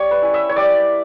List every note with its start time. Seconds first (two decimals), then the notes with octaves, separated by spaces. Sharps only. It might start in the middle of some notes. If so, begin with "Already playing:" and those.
Already playing: G3 C#5
0.11 B4
0.22 C#4 E4
0.34 E5
0.49 C#5
0.56 G3 D5